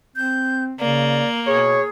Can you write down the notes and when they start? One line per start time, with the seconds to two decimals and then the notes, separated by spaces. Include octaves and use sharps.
0.16 C4 G6
0.80 C#3 A#3 D5
1.47 B2 G#4 C#5